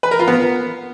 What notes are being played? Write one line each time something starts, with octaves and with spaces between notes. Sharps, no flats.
B4
A#4
F4
B3